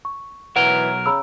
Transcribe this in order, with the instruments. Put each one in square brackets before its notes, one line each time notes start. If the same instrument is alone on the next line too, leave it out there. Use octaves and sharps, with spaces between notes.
[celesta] C#6
[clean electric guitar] B1 F#3 A#4 [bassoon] E3 [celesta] F#5 G7
[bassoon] C#3 [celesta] A#5 B5 E6